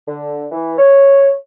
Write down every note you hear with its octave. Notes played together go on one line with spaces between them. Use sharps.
D3
E3
C#5